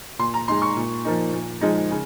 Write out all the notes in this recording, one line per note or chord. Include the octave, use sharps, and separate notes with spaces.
A#2 C6
A#5
G#3 D#4 C6
C#6
A#2
F3 A#3 D#4
A#2
F3 G#3 D#4
C#3